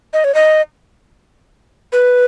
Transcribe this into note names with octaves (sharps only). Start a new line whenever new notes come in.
D#5
C#5
D#5
B4